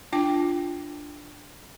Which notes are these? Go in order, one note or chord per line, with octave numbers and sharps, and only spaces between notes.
D4 F4 G5 D6